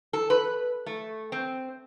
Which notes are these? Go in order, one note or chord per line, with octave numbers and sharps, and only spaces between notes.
A4
B4
A3
C4